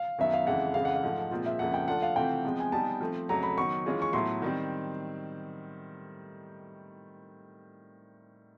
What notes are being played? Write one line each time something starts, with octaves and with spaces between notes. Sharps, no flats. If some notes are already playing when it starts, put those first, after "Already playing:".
Already playing: F5
F#2 D#3 F#3 B3 E5
F5
F2 C#3 E3 G#3 F#5
F2 C#3 E3 G#3 F5
F#5
F5
G#2 F3 A3
A#2 F3 G#3 C4 F4
E5
F2 C#3 F3 A#3 F#5
G5
F3 A3 D4 F4 A4 F#5
F5
C3 E3 A3 C4 F4 G5
C3 F3 G#3 B3
G#5
G3 B3 D#4 A5
F3 A3 C4
F2 C#3 F#3 A3 A#5
B5
D#3 F#3 B3 C#6
E3 G#3 C#4 F4 G#4
C#6
A2 F#3 B3 E4 A4 C6
D#3 G3 C4